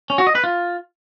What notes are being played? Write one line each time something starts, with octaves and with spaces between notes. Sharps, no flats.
C#4
F#4
D#5
B4
F4